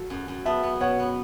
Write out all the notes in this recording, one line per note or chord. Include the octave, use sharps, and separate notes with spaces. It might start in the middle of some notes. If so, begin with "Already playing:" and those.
Already playing: F#3 A4
F#2
F#2
B3 E5 A5
B3
B2 C#5 F#5
B3